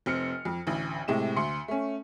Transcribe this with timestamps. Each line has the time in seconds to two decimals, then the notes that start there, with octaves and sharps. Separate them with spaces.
0.06 F1 C4 F6 C#7
0.45 F2
0.67 A1 D2
1.08 A2 C3 G#3 E7
1.36 D2 C6 C#7
1.68 A3 C#4